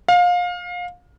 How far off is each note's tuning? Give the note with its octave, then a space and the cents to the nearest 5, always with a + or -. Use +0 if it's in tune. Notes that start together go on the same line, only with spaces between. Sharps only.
F5 +25